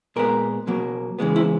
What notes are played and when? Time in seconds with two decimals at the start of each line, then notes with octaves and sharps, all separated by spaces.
0.16 A#2 G#3 B3 A#4
0.67 B2 F#3 A#3
1.19 C#3 E3 G#3 B3
1.36 E4